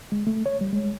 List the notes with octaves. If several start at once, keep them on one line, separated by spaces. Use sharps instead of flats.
G#3
A3
C#5
G3
G#3